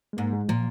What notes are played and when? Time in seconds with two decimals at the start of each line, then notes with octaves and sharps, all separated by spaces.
0.13 G#3
0.17 G#2 A#3
0.33 G#3
0.49 A#2 F3